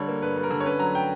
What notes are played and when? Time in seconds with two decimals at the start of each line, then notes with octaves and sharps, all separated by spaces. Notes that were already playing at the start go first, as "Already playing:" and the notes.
Already playing: D3 G3 C#5
0.08 A#3
0.22 G2 B4
0.36 G3
0.43 A#4
0.50 D3
0.60 C#5
0.65 C#4 B4
0.79 F#3 A#5
0.95 G5